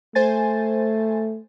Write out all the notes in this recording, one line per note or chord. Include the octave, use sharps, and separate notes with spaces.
A3 C5 G#5 A6